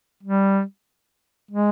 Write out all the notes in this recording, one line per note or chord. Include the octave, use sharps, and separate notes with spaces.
G3
G#3